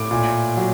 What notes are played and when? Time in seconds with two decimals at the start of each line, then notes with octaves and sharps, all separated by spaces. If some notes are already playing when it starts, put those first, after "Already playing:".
Already playing: A2 D6
0.11 A#2
0.57 F#3